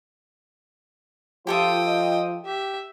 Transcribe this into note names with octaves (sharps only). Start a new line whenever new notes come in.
F3 F4 G4 A4 E5 G5 D#6
D#5
G4 E5